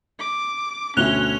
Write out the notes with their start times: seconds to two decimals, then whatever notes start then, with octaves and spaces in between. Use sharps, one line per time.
0.19 D6
0.97 D2 B2 C#4 E5 F#6 F7 G7